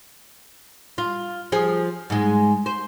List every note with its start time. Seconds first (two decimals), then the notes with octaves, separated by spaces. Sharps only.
0.98 F4
1.52 F3 G#4
2.10 G#2 G#3
2.66 C5